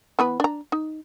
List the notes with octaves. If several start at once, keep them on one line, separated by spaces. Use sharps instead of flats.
E3 B3 B4
D4 A#5
D#4